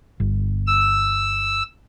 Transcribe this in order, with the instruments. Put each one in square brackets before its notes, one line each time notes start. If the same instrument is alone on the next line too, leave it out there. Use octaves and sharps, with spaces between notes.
[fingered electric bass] G1
[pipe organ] E6